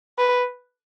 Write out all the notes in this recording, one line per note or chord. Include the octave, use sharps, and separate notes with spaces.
B4